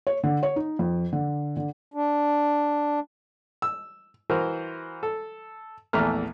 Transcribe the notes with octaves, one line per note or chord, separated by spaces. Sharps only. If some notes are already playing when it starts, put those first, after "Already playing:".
C#5
D3
C#5
D#4
F2
D3
D3
D4
E6
E3 F#4 A#4 C5
A4
A#1 E2 E3 A3 A#5 F6